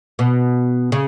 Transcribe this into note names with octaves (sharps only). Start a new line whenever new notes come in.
B2
C#3